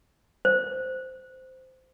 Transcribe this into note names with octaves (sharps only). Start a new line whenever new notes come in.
C5